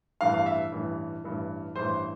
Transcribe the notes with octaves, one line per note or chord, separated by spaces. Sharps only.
A1 G2 E3 F5
F5
E5
A1 G2 E3
A1 G2 E3
A1 G2 E3 C5